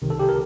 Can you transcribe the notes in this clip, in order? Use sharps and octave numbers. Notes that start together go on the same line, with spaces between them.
C2 C3 D#3
A4
G4
A#4